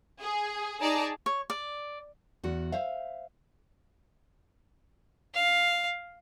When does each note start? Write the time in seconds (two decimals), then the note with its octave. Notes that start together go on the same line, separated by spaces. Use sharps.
0.20 G#4
0.81 D#4 G#4 D5 A5 A#5
1.26 C#5
1.50 D5
2.43 E2 F#4
2.72 C5 E5 F5
5.35 F5